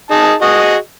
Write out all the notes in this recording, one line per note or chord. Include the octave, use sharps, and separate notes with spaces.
D#4 G#4 A5
F#4 G#4 D#5